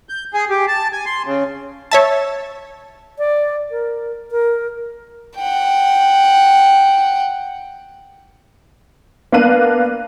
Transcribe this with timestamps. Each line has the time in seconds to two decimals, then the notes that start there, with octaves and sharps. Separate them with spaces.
0.09 G6
0.34 G#4
0.50 G4
0.68 A5
0.92 G#5
1.06 C6
1.26 C#3
1.91 C#5 E5 A5
3.18 D5
3.71 A#4
4.31 A#4
5.38 F#5 G5
9.32 A#3 B3 D4 F5 F#6 D#7